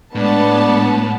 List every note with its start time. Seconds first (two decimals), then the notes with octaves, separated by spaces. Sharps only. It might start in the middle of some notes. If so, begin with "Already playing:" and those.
0.15 A2 G#3 B3 D4 A5